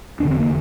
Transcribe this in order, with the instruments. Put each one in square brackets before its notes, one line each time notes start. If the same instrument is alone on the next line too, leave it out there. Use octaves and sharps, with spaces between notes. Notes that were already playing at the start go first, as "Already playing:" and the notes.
[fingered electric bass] F1 E2 D3 D4
C4
A#3